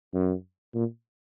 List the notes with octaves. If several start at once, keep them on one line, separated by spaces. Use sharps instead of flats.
F#2
A#2